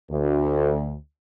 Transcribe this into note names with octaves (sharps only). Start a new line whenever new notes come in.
D2